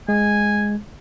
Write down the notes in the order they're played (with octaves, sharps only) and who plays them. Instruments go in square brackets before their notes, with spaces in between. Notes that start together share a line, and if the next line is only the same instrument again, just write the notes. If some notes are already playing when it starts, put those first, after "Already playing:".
[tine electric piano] G#3 [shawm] G#5